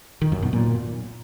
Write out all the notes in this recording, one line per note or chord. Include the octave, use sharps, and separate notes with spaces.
D#3
F#2
B2
A#2